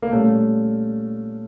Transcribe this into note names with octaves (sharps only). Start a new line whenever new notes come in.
A#3
A#2 G3 A3 C#4